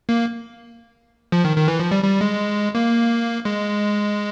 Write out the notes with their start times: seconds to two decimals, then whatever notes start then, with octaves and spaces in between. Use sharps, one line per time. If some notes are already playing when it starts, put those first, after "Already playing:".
0.09 A#3
1.32 F3
1.45 D#3
1.57 D#3
1.68 E3
1.80 F3
1.91 G3
2.04 G3
2.21 G#3
2.75 A#3
3.45 G#3